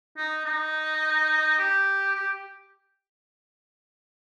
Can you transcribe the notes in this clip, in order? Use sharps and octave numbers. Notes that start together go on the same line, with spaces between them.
D#4
D#4
G4
G4